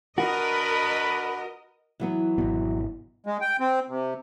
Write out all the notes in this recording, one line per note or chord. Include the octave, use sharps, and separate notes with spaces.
D4 F#4 A#4 B4 D#5 B5
E3 F#3 B3
G#1 B2
G#3
G5
C4
C3